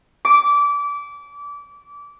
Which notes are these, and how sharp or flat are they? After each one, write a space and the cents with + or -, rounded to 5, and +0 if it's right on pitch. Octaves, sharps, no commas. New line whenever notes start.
D6 -25